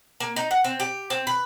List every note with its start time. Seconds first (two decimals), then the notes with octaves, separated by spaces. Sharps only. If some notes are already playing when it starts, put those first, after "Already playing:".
0.20 A#3
0.36 D#4
0.51 F#5
0.64 C4
0.80 G4
1.10 C4
1.27 B4